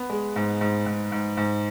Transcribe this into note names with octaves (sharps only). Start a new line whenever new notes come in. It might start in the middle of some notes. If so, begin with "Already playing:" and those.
Already playing: B3
G#3
G#2
G#2
G#2
G#2
G#2